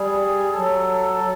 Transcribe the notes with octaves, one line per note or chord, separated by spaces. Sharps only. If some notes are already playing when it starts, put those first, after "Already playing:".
Already playing: G3 G#4
F#3 A4